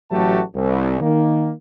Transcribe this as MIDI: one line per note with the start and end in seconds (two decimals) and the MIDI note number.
0.11 0.41 33
0.11 0.41 54
0.11 0.41 57
0.11 0.41 66
0.11 0.41 67
0.11 0.41 81
0.55 1.00 36
1.01 1.52 51
1.01 1.52 58